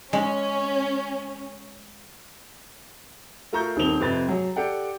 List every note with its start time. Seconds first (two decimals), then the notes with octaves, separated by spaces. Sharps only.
0.13 G#3 C#4
3.52 A3 F4 A#4 A#5 C#6 G6
3.76 D#1 D#3 A#3 C4 F7 G7
4.00 F2 C3 B4 C5 C6 A6
4.28 F#3 G#4
4.56 G4 A4 D5 F#5 G5